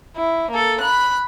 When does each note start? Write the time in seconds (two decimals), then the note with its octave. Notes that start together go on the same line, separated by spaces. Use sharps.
0.17 E4
0.51 A#3 A4
0.81 B5 F#6